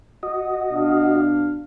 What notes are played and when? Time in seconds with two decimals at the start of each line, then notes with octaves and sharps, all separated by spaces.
0.23 F#4 D#5
0.70 B2 D4 F5